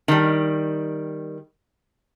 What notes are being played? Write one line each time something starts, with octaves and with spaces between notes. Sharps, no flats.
D#3 G3